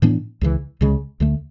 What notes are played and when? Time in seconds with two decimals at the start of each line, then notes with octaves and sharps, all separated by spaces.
0.02 A2 E3 B3 D4
0.41 C#2 C#3 E3
0.81 C#2 C#3 G#3
1.20 D2 D3 A3